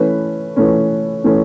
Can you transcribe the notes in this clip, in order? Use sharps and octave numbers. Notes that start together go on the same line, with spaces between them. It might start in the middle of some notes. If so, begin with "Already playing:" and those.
Already playing: E3 A3 C#4 B4
E3 A3 C#4
E3 A3 C#4